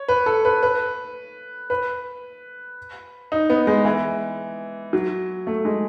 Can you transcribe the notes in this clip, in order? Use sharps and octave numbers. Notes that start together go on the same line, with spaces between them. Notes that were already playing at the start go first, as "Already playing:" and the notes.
Already playing: C#5
B4
A4
B4
B4
B4
D#4
B3
G#3
E3
F#3
A3
G#3